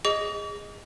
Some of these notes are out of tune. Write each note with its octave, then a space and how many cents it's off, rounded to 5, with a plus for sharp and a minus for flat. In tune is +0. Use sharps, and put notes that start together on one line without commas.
G#4 -20 D#5 +0 D6 -45